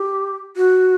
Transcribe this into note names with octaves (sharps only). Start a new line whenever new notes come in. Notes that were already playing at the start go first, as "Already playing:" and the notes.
Already playing: G4
F#4